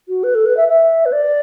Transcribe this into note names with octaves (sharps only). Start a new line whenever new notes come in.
F#4
B4
A4
B4
E5
E5
B4
D5